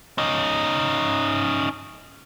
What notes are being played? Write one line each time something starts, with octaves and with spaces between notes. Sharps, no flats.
C#4 D#4